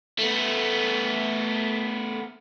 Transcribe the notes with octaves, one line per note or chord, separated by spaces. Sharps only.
A3 B3